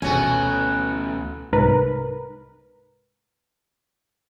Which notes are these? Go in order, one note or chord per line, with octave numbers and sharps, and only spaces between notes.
D2 B2 A3 B3 C#4 F#4 G#5
C2 G#2 A#4 B4